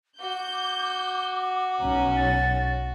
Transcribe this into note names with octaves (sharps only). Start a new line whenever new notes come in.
F#4 D6 G6
B1 C#4 A#5
A6